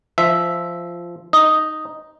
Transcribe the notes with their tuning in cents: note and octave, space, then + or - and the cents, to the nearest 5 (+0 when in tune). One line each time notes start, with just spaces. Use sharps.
F3 -10 E5 +0
D#4 +0 D#5 +0